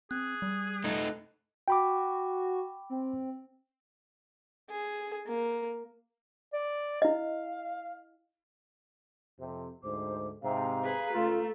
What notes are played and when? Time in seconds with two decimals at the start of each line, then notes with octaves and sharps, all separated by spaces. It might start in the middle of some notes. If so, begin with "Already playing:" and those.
0.11 C4 G#4 F#6
0.42 G3
0.84 A3 D#4
1.68 F#4 G5 B5 D6
2.90 C4
4.69 G#4
5.26 A#3
6.53 D5
7.02 E4 D#5 F5
9.40 F2 C3
9.83 D2 G#2 C5 D6
10.43 G#2 C3 F5 A#5
10.84 G#4 B4
11.13 C#2 A3 F4